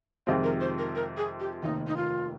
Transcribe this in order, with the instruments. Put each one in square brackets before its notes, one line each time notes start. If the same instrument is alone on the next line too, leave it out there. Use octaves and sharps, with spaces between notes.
[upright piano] F2 C3 D#3 G#3 C4 [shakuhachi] F5
[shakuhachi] A#4
C5
A#4
A#4
G#4
G4
[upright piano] F1 D#2 D#3 [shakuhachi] D#4
[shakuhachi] D#4
F4